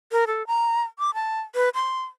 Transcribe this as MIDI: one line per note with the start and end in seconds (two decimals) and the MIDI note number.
0.12 0.25 70
0.27 0.45 69
0.47 0.81 82
0.99 1.14 86
1.14 1.40 81
1.55 1.69 71
1.74 2.02 84